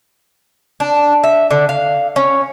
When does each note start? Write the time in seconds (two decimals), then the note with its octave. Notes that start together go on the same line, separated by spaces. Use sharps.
0.80 D4
1.24 E5
1.51 D3
1.69 F5
2.16 C#4